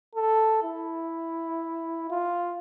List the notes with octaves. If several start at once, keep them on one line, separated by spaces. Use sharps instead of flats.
A4
E4
F4